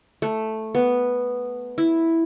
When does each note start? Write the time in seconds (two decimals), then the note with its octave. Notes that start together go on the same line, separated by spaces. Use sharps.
0.22 A3
0.75 B3
1.78 E4